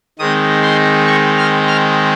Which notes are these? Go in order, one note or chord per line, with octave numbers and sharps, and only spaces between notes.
D#3 G#3 C4 D#4 D#6
C6
C#6
F6
F6